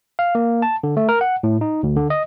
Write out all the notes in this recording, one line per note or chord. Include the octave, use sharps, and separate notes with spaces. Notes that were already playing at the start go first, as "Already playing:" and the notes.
F5
A#3
A5
D3
A3
A#4
F#5
A2
D#4
D2
D3
D#5